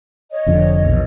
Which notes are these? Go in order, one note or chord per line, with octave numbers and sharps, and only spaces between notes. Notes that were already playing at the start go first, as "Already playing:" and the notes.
C#5 D#5
F1 F2 D3
A#1 E2 B2